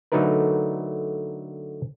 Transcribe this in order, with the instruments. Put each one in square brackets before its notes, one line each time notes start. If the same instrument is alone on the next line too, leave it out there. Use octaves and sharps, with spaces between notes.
[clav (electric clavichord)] D3 F#3 A3 D#4 A#4 B4